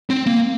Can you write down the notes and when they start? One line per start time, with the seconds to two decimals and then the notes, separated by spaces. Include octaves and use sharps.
0.10 C4
0.26 A#3